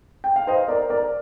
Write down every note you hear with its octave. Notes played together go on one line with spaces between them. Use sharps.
G5
F5
C5 D#5
A#4 D5
A#4 D5